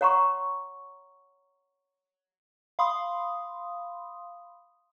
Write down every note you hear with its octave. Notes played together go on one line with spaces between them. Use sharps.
C#5 F#5 A#5 C6 C#6
F5 B5 C6 D#6